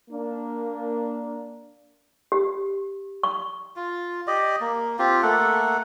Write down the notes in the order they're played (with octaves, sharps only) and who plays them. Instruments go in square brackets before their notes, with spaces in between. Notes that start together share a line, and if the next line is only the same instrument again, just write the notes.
[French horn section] A#3 D4
[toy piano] G4
C#6
[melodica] F4
G4 D5 D#5
A#3
C4 F4 G4
A3 A#3 A4 F#5